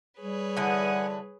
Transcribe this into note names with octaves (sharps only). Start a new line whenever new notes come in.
G3 G#4 B4 C#5
D3 E3 F#5 G#5 D#6